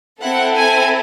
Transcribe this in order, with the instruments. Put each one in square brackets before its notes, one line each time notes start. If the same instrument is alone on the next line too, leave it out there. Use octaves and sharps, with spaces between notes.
[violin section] C4 E4 A4 F#5
G#5